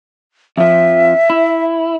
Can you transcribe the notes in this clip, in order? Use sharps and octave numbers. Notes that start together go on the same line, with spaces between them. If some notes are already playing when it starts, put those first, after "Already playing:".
F2 F3 E5
E4